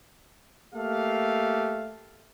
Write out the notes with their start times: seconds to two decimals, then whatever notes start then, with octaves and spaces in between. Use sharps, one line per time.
0.75 A3 A#3 G4 F5